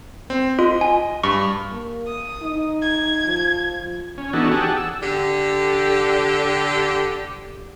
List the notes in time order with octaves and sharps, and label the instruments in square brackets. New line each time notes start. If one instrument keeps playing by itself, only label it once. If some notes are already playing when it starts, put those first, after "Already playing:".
[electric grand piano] C4
[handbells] F4 [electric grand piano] D#5
[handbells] G#5
[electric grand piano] G2 [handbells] C#6
[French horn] A#3
[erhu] D#6
[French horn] D#4
[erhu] G#6
[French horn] F3
[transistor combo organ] C#4
E3 B3 D4 D#4 F#4 A4
G4 G#4 F#5 A5
E6
[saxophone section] D3 G4